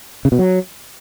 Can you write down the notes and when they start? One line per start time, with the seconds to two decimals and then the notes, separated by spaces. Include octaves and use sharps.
0.25 C#3
0.32 B2
0.39 F#3